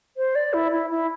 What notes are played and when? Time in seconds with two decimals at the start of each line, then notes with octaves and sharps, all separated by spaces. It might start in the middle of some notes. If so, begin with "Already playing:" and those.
0.17 C5
0.35 D5
0.53 E4
0.72 E4
0.90 E4